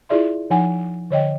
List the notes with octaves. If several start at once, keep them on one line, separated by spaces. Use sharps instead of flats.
E4 F4 G#4 D5 E5 C6
F3 D#4 F#5 G#5
D3 C#5 D#5 G5